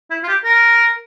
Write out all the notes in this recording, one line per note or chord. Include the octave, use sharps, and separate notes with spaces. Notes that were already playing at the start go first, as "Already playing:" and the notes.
E4
F4
G4
A#4